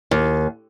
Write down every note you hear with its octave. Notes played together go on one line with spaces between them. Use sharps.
D#2